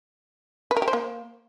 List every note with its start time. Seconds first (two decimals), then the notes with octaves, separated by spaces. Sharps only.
0.71 B4
0.76 A#4
0.82 G4
0.88 C5
0.93 A#3